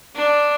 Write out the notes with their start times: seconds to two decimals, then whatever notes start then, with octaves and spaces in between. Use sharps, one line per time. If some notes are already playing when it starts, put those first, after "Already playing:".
0.15 D4